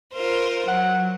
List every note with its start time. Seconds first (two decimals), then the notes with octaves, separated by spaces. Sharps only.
0.12 F4 A#4 C5
0.68 F#3 F#5